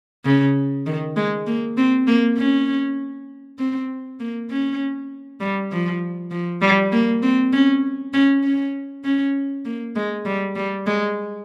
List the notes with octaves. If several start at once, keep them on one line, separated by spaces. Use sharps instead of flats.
C#3
D#3
G#3
A#3
C4
A#3
C#4
C4
A#3
C#4
G3
F3
F3
G3
A#3
C4
C#4
C#4
C#4
C#4
A#3
G#3
G3
G3
G#3